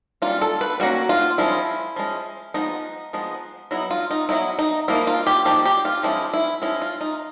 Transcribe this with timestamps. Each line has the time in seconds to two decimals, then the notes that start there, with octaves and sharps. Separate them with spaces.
0.22 G3 A#3 C#4 F4
0.41 A4
0.61 B4
0.80 G3 A#3 C#4 F#4
1.09 F4
1.38 F3 G#3 C#4 E4
1.96 F3 G#3 C#4
2.54 F3 G#3 B3 D#4
3.13 F3 G#3 B3
3.71 F#3 B3 D#4 E4
3.91 F4
4.11 D#4
4.29 F#3 B3 D#4 E4
4.59 D#4
4.88 F3 A#3 D#4 E4
5.07 F4
5.27 G4
5.45 F3 A#3 D#4 G4
5.66 G4
5.85 F4
6.03 F3 G#3 C#4 E4
6.34 E4
6.62 F3 G#3 C#4 E4
6.82 F4
7.01 D#4